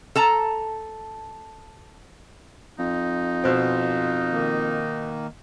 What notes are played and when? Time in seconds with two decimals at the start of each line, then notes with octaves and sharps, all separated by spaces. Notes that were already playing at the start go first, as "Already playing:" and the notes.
0.15 A4 A5 A#5
2.79 F2 D#4
3.44 B2 C4
4.31 D#3 A#3